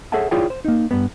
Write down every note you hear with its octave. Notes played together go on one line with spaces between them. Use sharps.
G#4 A4 C#5 E5 F#5 A5
E4 F4 G#4 C#5 D5 G5
C5
A#3 D#4
G2 B3